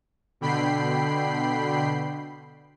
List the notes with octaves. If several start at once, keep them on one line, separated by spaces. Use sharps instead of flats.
B2 D3 G5 B5 C7